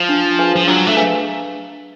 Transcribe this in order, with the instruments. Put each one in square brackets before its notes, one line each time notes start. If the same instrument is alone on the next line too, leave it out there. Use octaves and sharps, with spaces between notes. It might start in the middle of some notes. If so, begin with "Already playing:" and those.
Already playing: [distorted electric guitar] F3
[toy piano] D4
G#4 B4 F5 G#5
[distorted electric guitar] F3
[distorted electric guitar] F#3 [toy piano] D4
[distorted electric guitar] A3
[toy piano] G#4 B4 F5 G#5